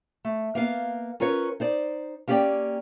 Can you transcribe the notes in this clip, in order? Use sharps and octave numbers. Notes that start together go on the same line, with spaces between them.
A3
A#3 B3 F5
C#4 F4 A#4 B4 C#5
D#4 C5 D5
A#3 C#4 G4 A#4 D5 G5